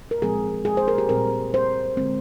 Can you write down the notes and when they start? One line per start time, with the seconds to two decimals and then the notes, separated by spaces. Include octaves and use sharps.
0.11 A#4
0.22 A#2 F3 G#3 C4 G#4
0.65 G#4
0.77 C5
0.88 A#4
0.98 G4
1.09 A#2 G3 C4 A#4
1.54 C5
1.97 D3 G#3 C4